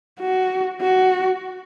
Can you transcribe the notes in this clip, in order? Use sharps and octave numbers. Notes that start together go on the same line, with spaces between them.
F#4
F#4